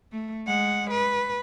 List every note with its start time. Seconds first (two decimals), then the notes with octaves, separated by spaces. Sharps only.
0.12 A3
0.46 G#3 F#5
0.91 B4